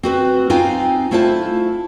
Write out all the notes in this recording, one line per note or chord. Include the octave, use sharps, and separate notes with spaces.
C4 F#4 B4
C4 D#4 F4 F5 G5 G#5
A3 E4 F4 C5 A5